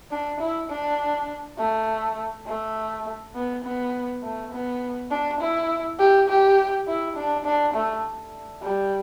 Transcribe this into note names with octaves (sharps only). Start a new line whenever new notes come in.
D4
E4
D4
A3
A3
B3
B3
A3
B3
D4
E4
G4
G4
E4
D4
D4
A3
G3